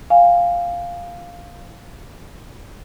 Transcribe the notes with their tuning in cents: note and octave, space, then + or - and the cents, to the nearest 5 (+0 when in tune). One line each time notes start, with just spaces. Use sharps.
F5 +0 G#5 -20